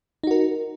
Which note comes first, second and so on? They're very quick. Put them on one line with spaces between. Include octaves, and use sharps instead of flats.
D#4 F#4 A#4